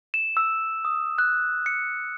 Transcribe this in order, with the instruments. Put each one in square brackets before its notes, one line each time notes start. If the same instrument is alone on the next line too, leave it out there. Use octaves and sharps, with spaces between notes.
[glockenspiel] E7
E6
D#6
F#6
C#7